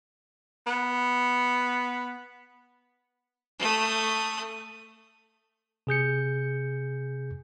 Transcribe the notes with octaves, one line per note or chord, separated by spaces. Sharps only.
B3
A3 D#6
C3 G#4 G6 C#7